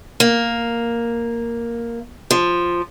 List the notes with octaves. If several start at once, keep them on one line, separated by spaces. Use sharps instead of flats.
A#3
F3